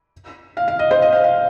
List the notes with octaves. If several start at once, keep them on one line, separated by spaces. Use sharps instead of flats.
F5
F5
D#5
C5
D#5
F5
F5